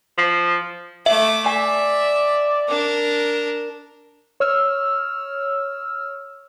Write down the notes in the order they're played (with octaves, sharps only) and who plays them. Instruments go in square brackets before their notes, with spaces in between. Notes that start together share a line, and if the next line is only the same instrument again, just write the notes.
[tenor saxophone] F3
[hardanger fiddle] A3 D6 [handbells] E5
[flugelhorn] D5 [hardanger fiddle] E5 [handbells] G#5
[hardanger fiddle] D4 A#4
[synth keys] C#5 E6 F6